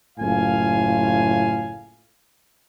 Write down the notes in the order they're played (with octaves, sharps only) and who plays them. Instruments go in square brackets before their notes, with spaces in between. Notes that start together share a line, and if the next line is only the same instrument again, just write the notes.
[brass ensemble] F#1 A2 F4 F5 G#5